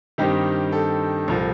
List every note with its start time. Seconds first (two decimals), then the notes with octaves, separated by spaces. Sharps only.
0.18 G2 D#3 G3 C4 D#4 G4
0.72 A4
1.28 C2 A#2 F3